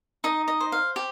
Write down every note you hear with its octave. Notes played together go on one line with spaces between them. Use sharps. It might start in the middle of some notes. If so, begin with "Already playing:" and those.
D#4 D#5
D#5
C5
F5
G4